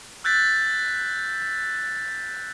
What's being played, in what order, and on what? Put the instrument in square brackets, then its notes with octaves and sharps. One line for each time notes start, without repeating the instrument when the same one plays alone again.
[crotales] E6 F#6 G6 A6 B6